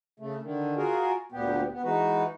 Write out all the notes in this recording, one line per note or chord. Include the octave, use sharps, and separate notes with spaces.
C#3 A3
D3 D#3
F4 F#4 G#4 A#4
D2 A#2 B3 G4
B3
E3 G#3 D#4 F#4 B4